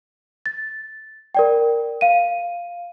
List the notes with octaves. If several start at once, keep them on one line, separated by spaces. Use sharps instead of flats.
A6
A#4 D5 G5
F5 D#7